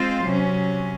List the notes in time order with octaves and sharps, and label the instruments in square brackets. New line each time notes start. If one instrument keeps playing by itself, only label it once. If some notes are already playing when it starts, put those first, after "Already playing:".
Already playing: [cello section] G#3 C4 F4 C5
C3 F#3 C#4